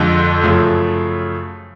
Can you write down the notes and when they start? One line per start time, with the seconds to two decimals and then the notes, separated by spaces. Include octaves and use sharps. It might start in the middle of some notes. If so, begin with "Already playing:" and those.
Already playing: F2 D3 F3 G#3
0.44 F#2 C#3 F3 A3